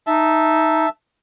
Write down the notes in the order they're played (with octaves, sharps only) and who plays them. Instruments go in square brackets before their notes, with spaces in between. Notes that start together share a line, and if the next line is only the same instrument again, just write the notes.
[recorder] D#4 [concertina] E5 A5